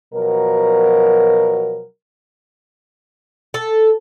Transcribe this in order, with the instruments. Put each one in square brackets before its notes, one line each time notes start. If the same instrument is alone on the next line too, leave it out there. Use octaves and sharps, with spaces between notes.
[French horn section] B2 F3 F#3 A#4
[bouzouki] A4